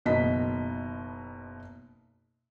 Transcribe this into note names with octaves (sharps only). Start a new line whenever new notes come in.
F#1 B2 D#3 D#5 B6